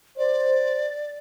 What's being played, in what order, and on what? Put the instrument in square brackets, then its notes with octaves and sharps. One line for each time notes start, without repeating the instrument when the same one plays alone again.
[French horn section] C5 [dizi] D5